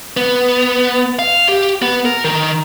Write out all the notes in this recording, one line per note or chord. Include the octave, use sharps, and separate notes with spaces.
B3
F5
G4
B3
A#4
D#3